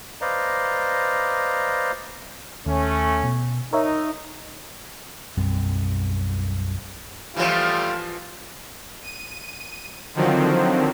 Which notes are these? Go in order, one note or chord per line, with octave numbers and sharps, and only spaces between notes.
B4 C5 D5 D#5 F5 A#5
D#2 A3 C#4
B2
D#4 A#4 C#5 E5
B1 F#2 G3 C4
E3 F3 G3 A3 F4
D#7
D3 D#3 F3 F#3 C4